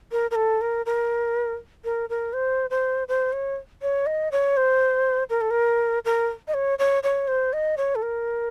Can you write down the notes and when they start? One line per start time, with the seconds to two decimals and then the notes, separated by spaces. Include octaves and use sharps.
0.12 A#4
0.31 A#4
0.36 A4
0.61 A#4
0.86 A#4
1.85 A#4
2.10 A#4
2.33 C5
2.70 C5
3.08 C5
3.33 C#5
3.82 C#5
4.06 D#5
4.32 C#5
4.57 C5
5.30 A#4
5.41 A4
5.51 A#4
6.05 A#4
6.48 D#5
6.54 C#5
6.79 C#5
7.03 C#5
7.28 C5
7.53 D#5
7.77 C#5
7.95 A4
8.02 A#4